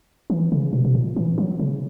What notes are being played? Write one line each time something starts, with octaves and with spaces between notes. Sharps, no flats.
E3
C#3
B2
B2
A#2
E3
F#3
C#3